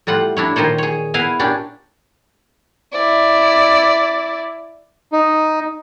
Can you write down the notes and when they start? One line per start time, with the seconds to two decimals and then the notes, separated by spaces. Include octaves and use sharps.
0.07 A2 G3 F4 F#5
0.37 D4 E4 C#5
0.56 A#2 D#3 F4 C5 C#5
0.78 G#4 C#5
1.14 B3 E4 F5 G#5
1.39 A#2 C#4 D4 G4 D5
2.93 E4 D5
5.12 D#4